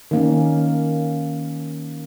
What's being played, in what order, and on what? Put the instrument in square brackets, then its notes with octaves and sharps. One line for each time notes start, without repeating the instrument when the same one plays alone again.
[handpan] D#3 A#3 C#4